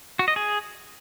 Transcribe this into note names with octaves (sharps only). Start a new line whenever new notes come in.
F#4
D#5
G#4